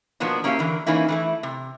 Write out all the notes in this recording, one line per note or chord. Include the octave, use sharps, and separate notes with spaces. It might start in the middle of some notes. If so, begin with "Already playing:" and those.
B2 F3 F#3 A#3 B3 D4
A#3 C#4 E4 F4 G4 F5
D3 E3 A#4
E3 A#3 C#4 D#4 E4
E3 A3 E4
C3